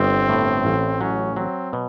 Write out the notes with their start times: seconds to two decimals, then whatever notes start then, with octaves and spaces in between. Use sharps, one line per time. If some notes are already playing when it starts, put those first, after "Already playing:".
Already playing: G1 C4
0.29 A2
0.65 A1
1.01 F#3 C#4
1.36 F#3 C4
1.73 B2